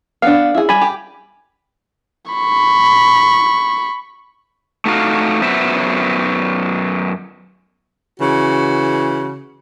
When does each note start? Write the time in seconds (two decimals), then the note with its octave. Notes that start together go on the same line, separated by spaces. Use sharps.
0.22 B3 D4 F5
0.55 E4 G#4
0.69 G3 G#5 B5
0.81 G4
2.31 B5 C#6
4.85 A3 D#4 F#4 F5
5.42 F#2 F#3 B3 C5 E5
8.19 C#3 E3 F#4